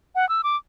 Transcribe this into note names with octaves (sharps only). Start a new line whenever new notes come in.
F#5
E6
D6